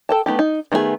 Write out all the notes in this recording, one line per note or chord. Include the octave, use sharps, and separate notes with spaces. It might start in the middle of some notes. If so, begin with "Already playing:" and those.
A4 G5 A5
A3 B3 D#4 G4
D#4
D#3 A3 B3 D#4 G#4